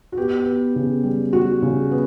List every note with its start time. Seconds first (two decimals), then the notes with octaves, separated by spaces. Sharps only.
0.12 F#4
0.17 B3 G4
0.46 B3
0.76 C#3
1.03 G3
1.33 G3 F#4
1.62 C#3
1.91 B3